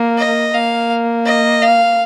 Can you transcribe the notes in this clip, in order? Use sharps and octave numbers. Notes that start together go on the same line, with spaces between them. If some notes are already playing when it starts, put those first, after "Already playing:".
Already playing: A#3
D#5
A#3 F5
D#5
F5